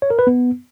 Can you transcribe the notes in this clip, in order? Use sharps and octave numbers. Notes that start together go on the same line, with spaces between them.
C#5
A#4
B4
B3